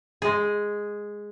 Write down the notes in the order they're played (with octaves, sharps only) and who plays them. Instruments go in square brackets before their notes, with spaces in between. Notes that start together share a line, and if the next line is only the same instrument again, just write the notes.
[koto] G#3 G#4